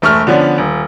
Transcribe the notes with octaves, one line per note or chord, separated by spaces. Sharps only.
E1 A3 C#6 F6
D3 F3 B3 C#4 D4
D#1